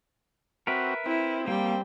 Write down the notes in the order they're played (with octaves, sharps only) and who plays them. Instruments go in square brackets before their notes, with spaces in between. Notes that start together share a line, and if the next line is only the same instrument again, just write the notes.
[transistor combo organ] C4 F#4 [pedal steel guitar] A#4 B4 E5
[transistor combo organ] C4 [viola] E4
[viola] G3 G5 [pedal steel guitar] A#3